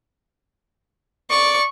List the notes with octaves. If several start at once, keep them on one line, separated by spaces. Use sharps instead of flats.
D5 C#6